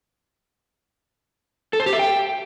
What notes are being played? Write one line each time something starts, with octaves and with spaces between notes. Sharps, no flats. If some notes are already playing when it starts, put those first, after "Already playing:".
A4
C5
G4
E5
G5